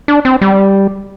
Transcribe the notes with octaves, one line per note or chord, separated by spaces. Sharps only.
D4
C4
G3